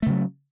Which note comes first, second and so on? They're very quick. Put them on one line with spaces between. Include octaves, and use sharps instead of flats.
A3 C#3 F#3